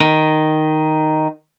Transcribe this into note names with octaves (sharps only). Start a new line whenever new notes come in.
D#3